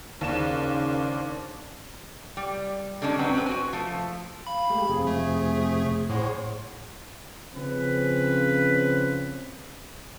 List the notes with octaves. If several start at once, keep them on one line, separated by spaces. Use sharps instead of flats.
D#2 C#3 D4 C5 D5 E7
G3
D3 G3 G#3 C#4 D4
F#3 C4 C#4 B4
C4 B4
F#4 G#5
F3 A3
F5 B5
G#3 A3 G4
F2 C3 G#4
A3
A2 G#4 C5 C#5 F#5
C#3 F3 C4 C#4 B4